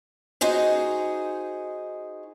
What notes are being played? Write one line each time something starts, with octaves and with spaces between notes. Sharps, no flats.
D#4 F#4 G#4 C5